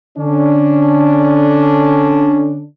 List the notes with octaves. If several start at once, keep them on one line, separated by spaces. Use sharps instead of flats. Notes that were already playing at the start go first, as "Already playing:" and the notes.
D3 C#4 D4